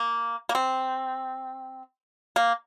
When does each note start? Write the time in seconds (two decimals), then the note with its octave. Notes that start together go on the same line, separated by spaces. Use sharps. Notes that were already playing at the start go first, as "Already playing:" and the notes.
Already playing: A#3
0.49 A#3
0.55 C4
2.36 A#3